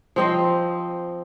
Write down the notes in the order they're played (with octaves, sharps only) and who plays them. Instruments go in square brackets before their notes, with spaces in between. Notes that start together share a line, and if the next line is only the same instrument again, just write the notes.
[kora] F3 C4 D#5